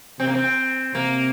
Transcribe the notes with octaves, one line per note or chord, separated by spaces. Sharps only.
C3 C4
A#3
C4
C3 A#3